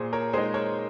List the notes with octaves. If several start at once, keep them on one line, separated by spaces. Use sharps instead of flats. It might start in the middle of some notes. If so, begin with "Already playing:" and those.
Already playing: A#2 G#4 C5
A#4 C#5
G#3 D#4 G#4 C5
A#4 C#5